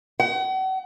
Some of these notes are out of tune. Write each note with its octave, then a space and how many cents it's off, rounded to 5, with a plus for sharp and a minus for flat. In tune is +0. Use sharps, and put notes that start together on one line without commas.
F#5 +40